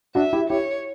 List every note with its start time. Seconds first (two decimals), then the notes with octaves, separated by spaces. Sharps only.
0.15 D4 F#4 E5
0.33 E4 G4
0.50 E4 G4 C#5